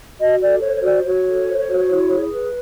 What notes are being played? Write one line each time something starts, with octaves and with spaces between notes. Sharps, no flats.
F#4 D#5
A4 D5
C5 C#5
C#5
F#4 D5
F#4 C#5
A4
C5
F#4
E4
G#4
B4